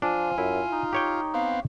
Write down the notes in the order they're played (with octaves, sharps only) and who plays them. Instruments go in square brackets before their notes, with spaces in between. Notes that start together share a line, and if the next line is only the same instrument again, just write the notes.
[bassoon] F3 [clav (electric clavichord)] D4 [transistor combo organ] F4 [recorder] G#5
[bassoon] F#2 [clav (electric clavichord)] E4
[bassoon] D#4
[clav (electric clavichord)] G4 C#5 G5
[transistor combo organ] B3 C4 [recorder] F5